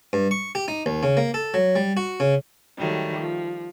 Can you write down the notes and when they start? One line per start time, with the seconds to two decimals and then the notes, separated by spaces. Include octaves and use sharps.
0.13 G2
0.31 C#6
0.55 G4
0.68 D#4
0.86 D#2
1.03 C#3
1.17 A#3
1.34 A4
1.54 F#3
1.76 G3
1.97 F#4
2.20 C#3
2.77 D#3 F#3 G3 A3
3.19 F3